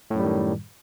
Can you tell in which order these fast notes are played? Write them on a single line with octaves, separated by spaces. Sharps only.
A2 F#2 G3 D#3